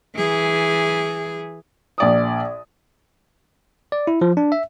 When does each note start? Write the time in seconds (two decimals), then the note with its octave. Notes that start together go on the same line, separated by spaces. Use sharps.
0.15 E3 G#4
1.98 A#1 D5 D#6
3.92 D5
4.07 E4
4.21 F3
4.37 D4
4.52 E5